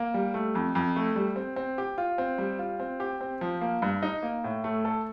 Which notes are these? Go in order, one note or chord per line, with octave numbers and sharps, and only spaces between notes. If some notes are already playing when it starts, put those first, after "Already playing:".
Already playing: A#3
G3
A3
F2
F2
A3
G3
C4
C4
G4
F4
C4
G3
F4
C4
G4
C4
F3
A#3
G2
D#4
A#3
A2
A3
A4